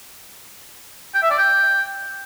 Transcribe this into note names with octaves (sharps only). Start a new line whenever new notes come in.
G5
E5
D5
G5